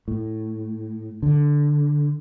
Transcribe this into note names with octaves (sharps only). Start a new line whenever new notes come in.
A2
D3